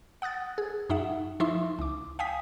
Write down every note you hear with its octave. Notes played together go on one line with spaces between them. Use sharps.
F#5 D#6 F#6 A6
G#4
F#2 D#4 E5 F#5
F3 D#4 E4 E5 C6 C#6
C#2 D6
F5 G5 G#5 D#6 B6